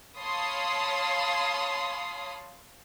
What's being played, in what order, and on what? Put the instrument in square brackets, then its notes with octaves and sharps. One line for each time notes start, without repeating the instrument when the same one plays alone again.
[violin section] C#5 F5 A5 B5 C6 D#6